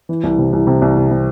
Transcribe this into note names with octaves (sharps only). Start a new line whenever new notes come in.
E3
C2
C3
C2
C3
C2
C3
C3